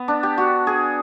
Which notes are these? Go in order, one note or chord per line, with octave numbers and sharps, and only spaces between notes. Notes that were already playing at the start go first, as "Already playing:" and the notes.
Already playing: B3
D4
G4
F#4
G#4